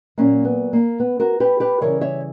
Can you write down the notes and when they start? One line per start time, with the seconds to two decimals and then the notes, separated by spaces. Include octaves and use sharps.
0.18 A#2 F#3 A#3 C#4
0.45 B3
0.73 A#3
1.00 B3
1.20 F#4 A#4
1.40 G4 B4
1.60 G4 B4
1.81 C#3 E3 G3 A#4 C#5
2.01 C#5 E5